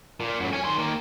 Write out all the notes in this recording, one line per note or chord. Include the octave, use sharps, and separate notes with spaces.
A#2
F#2 A2
C#5 G#5
D#3 C6
D#3 A#3